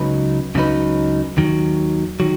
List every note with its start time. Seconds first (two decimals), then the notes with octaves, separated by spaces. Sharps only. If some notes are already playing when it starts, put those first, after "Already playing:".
Already playing: C#2 C#3 F#3 D#4 B4
0.55 C#2 C#3 F#3 D#4 B4
1.37 D#2 D#3 F#3
2.20 D#3 F#3